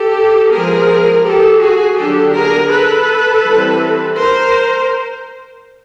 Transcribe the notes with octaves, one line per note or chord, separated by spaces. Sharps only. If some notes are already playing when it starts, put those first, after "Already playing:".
Already playing: G4 A4
F3 G#3 B3 G#4 A#4
G4 A4
F#4 G#4
D3 F#3 B3 D4 G4 A4
G#4 A#4
A4 B4
E3 G3 C4
A#4 C5